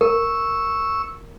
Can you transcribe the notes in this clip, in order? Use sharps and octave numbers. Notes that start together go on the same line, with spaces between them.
A#4 C#6 E6